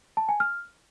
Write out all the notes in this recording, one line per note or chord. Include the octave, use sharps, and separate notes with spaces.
A5
G#5
F6